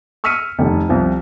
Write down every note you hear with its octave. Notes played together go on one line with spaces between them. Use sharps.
C#6 E6 F6 B6 C#7 D#7
F1 D#3
C2 F3